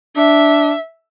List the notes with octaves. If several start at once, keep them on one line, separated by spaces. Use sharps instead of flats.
D4 E5